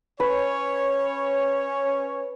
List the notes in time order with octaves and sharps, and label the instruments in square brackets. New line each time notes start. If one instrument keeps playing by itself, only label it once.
[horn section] C#4 C#5 [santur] B4